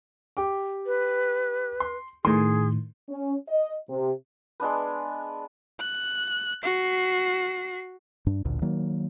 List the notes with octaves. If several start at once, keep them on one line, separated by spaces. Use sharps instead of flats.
G4 G5 D6
B4
C6
A2 D#3 G#4 C6
C#4
D#5
C3
G#3 B3 D4 B4
F#6
F#4 C7
G2 D4
A1 D2 A#2 D3
D#3 F#3 A#3